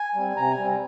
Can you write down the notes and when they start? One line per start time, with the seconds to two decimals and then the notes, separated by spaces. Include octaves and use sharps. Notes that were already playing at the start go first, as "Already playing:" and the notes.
Already playing: G#5
0.15 G3 C4
0.37 C3 A#5
0.51 G#5
0.59 G3 C4